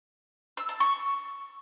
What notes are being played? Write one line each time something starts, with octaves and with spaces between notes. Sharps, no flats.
E6
A5
C#6